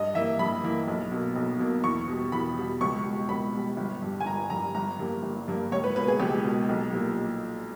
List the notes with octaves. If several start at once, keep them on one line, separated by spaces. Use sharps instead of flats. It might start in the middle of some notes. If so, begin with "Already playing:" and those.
Already playing: G2 D#5
E3 A#3 E5
G2 B5
E3 A#3
B1
B2 A#3
B1
B2 A#3
E2 C#6
B2 G3
E2 B5
B2 G3
C#2 C#6
B2 G3
C#2 B5
B2 G3
G1
G2 G3
G#5
G1 A#5
G2 G3 A#5
G1 A#5
G2 G3 A#3
G1
G2 G3 A#3
C#2 C#5
B4
B2 A#3 B4
G#4
C#2 G4
B2 A#3
B1
A#2 G3 A#3